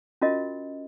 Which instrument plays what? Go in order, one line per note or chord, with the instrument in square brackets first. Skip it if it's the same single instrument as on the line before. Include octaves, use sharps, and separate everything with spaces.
[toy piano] C#4 F4 F#4 A#4 D#5